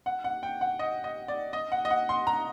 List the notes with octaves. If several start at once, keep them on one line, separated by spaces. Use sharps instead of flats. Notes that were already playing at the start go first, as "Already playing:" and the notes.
F#5
F#5
G5
F#5
D#5
D#5
D5
D#5
F#5
D#5
F#5
C6
A#5